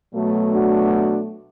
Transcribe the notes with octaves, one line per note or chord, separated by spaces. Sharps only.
B2 F#3 A3
D4 F#4